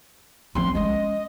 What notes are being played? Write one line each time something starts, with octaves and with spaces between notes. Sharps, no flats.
F3 C4 C6
G#3 C#4 D#5